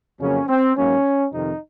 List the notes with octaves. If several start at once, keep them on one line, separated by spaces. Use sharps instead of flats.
F2 C#3 F#3 A#3 C#4
C4
G#2 F#3 A#3 C#4
F2 C3 D#3 D#4